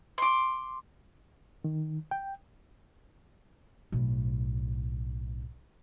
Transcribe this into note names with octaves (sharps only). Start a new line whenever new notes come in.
C6 D6
D#3
G5
B1 A2